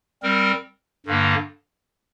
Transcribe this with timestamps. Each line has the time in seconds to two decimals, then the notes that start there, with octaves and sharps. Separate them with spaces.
0.23 G3 C4 A#4
1.06 G2 D3 A#3